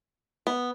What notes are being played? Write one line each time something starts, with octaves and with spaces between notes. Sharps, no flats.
B3